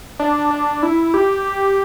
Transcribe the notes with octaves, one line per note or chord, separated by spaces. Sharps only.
D4
D4
E4
G4